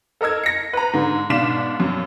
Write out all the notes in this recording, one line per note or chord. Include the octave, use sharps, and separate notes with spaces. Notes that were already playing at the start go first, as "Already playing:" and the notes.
A4 A#4 D#5 E6 G#6
A#6 C#7
B4 A#5
G#2 D3
G#2 B2 D4 F5 B6 E7
F#2